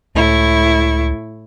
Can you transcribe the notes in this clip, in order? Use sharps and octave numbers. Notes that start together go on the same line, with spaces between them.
C#2 A2 E4 C#6